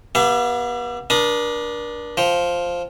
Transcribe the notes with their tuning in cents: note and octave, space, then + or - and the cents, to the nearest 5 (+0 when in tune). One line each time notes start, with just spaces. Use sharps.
B3 -35 G4 +0 E5 +45
D4 +0 A#4 +40 D#6 -5
F3 +0 G5 +0